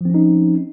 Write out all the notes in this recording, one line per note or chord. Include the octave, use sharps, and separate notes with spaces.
F3 C4 C#4 D#4